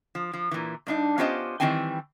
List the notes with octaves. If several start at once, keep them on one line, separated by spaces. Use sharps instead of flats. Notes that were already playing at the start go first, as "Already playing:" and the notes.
F3
F3
A#2 E3
G2 D4 D#4
B3 C#4 F4 G4 C5 D#5
D#3 E3 G3 C4 G5 G#5